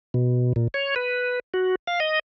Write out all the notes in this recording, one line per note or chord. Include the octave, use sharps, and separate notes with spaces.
B2
A#2
C#5
B4
F#4
F5
D#5